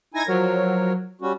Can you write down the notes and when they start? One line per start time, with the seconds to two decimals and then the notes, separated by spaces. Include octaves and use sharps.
0.14 D#4 E4 G#5 G#6 A#6
0.28 F3 F#3 A#4 C#5
1.21 G3 C#4 F#4